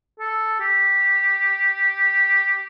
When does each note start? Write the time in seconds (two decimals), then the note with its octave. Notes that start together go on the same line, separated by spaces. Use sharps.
0.20 A4
0.60 G4